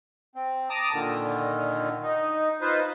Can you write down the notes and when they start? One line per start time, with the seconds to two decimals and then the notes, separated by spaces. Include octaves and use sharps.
0.35 C4
0.70 A5 A#5 D6 D#6
0.93 A#2 D3 D#3
2.03 D#4
2.61 D#4 F4 B4 C5